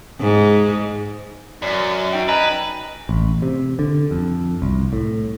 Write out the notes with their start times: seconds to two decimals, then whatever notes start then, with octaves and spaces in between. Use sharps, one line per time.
0.20 G#2
1.62 F#2 D5
2.13 D#4 G5
2.29 B4 D#5 G#5 A#5
3.09 A1
3.42 C3
3.79 D3
4.11 F2
4.62 C2
4.93 A2